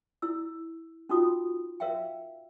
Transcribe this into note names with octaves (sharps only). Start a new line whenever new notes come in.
E4 E6
C#4 D#4 F4 F#4 D#6
A#4 C#5 E5 F5 G5